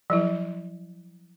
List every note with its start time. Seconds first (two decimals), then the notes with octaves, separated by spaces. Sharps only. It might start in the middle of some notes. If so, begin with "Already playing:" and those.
0.10 F3 F#3 E4